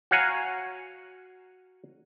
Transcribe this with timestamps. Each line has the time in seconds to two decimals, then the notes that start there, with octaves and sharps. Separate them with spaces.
0.11 F#4 C#5 F5 F#5 G#5 A#5